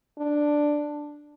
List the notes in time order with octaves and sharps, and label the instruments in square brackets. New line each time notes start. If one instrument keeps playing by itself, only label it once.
[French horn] D4